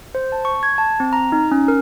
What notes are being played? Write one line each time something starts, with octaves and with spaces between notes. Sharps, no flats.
C5
A5
C#6
G#6
A5
C4
A#5
D#4
C#4
A#4